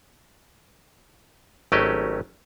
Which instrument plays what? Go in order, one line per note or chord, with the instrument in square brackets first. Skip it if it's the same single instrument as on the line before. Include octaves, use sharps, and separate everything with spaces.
[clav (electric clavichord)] G#1 F#3 A3 C#4 G4 D#5